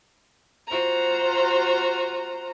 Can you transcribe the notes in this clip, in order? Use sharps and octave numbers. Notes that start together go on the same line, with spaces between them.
F4 F#4 C5 A#5